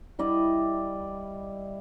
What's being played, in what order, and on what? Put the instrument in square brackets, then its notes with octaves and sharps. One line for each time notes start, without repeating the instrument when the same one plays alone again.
[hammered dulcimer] G3 E4 D5 D#5